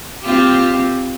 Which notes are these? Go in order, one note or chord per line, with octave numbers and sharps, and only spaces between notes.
C4 F4 G4